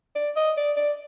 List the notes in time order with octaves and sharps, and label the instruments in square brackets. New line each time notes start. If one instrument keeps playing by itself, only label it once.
[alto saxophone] D5
D#5
D5
D5